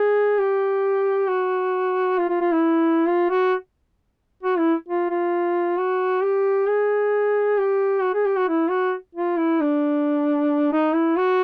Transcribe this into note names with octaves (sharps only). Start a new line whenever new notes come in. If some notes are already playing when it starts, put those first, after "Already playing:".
Already playing: G#4
G4
F#4
F4
F4
F4
E4
F4
F#4
F#4
E4
F4
F4
F#4
G4
G#4
G4
F#4
G#4
G4
F#4
E4
F#4
F4
E4
D4
D#4
E4
F#4